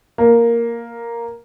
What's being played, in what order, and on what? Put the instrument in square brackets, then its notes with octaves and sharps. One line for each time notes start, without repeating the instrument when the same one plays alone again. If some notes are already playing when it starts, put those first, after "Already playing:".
[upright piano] A#3